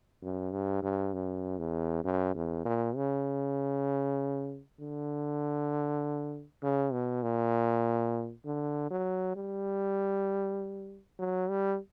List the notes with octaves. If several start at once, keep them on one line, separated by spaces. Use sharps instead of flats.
F#2
G2
G2
F#2
E2
F#2
E2
A#2
C#3
D3
C#3
B2
A#2
D3
F#3
G3
F#3
G3